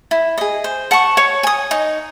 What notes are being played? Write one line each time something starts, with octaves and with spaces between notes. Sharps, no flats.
E4
G#4 D#5
C5
F#5 A5 C#6
C#5
G#5 D#6
D#4